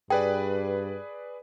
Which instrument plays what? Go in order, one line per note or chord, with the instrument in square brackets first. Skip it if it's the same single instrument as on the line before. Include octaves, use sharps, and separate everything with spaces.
[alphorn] G2 [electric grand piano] G#4 B4 D5 [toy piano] G5